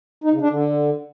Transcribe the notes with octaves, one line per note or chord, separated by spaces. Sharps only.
D#4
C#3
D4
D3